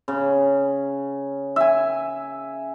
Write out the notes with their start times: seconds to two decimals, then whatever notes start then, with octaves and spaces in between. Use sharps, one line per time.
0.08 C#3
1.56 E5 G#5